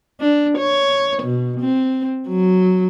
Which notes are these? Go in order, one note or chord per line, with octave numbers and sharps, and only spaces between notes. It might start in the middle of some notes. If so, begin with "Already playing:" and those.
D4
C#5
B2
C4
F#3